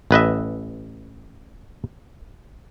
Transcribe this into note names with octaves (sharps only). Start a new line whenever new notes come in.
A1 B4 D#5 E5